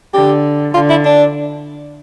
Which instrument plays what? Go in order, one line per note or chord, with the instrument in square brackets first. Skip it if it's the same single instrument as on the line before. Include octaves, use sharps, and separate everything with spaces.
[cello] D3 [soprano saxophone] G4
[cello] D3 [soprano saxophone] F4
[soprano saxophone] E4
D4